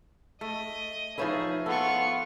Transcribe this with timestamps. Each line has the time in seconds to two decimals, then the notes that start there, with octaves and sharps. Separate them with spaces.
0.41 A3 D#5
1.18 F3 D#4 E4 G#4 B4 C#5 E5
1.66 B3 F4 A4 C#6